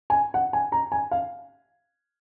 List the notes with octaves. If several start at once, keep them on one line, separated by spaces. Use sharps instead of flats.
G#5
F#5
G#5
A#5
G#5
F5